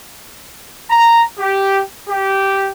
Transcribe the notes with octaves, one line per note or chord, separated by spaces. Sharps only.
A#5
G4
G4